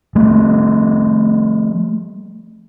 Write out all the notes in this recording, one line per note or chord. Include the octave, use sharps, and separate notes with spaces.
F3 G3 A3